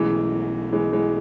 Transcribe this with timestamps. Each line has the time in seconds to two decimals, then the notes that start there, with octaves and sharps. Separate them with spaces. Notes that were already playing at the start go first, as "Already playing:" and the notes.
Already playing: B1 B2 E3 G#3 A3 C#4
0.72 E3 G#3
0.93 E3 G#3